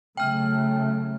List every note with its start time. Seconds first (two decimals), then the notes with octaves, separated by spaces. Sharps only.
0.17 C#3 F#3 A3 G5 F6